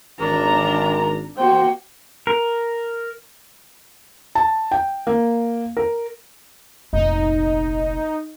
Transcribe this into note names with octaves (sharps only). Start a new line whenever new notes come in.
G#1 D4 A#4 A#5
A#3 F#4 C5 G5
A#4
A5
G5
A#3
A#4
F1 A#1 D#4